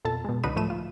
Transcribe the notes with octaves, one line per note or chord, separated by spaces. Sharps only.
F2 B2 A4 A5
B2 G#3
C#2 D3 F#3 D#4 B4 D#7
A2 F3 A3 D#7 E7
F4